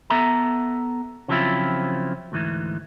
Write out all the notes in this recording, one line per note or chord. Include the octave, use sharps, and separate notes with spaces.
B3 A4 E5 A#5
C#3 F3 F#3 C4 E4 F4
D2 G#2 E3